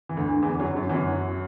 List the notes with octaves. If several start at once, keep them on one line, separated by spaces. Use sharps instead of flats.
E3
D2 D3
E2 E3
F#2 F#3
F#2 F#3
E3
F#2 F#3